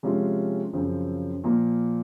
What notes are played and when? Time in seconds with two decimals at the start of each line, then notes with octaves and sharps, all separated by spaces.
0.03 C3 F3 G#3 C#4 F4
0.73 F#2 C#3 F3 C4
1.44 A#2 F3 A#3